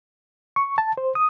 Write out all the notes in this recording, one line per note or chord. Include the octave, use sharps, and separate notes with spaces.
C#6
A5
C5
D#6